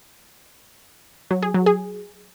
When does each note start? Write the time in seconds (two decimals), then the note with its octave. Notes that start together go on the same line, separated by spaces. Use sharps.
1.31 F#3
1.43 G#4
1.54 F#3
1.66 G#4